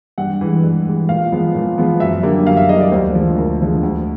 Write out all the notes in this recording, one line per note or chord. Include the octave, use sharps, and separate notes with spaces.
G2 F#5
E3 G#3
G2
E3 G#3
A#2 F5
F3 G#3 B3
A#2
F3 G#3 B3
F#2 E5
D3 G3 A#3
F#2 F5
E5
D3 G3 A#3 D#5
D5
D2 C5
D3 F3 G#3
D2 A#4
D3 F3 G#3
D2